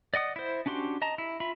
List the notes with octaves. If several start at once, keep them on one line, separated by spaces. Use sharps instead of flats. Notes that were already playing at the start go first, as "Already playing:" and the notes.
D5 D#5 F#5 D#6
E4 C5
C#4 D4 F#4 G4 C6
D#5 A5 A#5
E4
F4 E5 B5